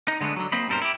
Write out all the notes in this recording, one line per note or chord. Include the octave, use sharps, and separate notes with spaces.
D#4
D3 G#3 A3 B3 D4
D3 F#3
A#3 C4 C5 D#5 B5
G2 B2 G3 A4 A#4 C5
E4 G4